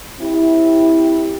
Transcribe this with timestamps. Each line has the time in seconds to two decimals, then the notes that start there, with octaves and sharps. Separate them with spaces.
0.20 C4 E4 G4